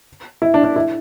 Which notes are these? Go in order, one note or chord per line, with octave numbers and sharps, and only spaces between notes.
E4
D4
D4
E4